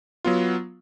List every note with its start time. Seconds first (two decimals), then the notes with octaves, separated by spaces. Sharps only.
0.24 F#3 B3 F4